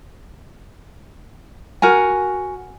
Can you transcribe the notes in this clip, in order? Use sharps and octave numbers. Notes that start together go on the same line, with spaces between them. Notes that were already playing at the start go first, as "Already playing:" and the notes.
F#4 A#4 G#5